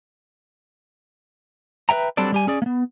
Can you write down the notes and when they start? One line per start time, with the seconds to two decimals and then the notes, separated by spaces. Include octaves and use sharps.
1.89 B4 C5 E5 G5 A#5
2.17 F#3 G3 C4 D4 A4 D5
2.32 G3 G4 G#5
2.47 C#4 G#4 D5
2.62 A#3 B3